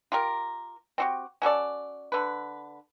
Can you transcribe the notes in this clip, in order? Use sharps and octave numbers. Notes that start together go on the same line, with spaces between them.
F4 G4 A#4
C4 F#4 G4
C#4 F#4 A4 D5
D3 B4